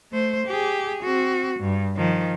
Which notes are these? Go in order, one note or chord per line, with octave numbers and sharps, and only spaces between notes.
A3 C5
G4 G#4
C4 F#4
G2
D#3 F3